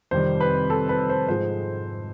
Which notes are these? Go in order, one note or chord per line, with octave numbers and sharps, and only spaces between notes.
F2 C3 D#3 G3 C5
B4
A4
B4
C5
G#2 F3 G#3 C5